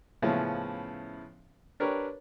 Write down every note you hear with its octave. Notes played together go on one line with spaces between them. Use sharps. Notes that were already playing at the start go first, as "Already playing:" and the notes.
A2 C#3 F3 B3 C#4 E4
D4 G4 A#4 B4 C#5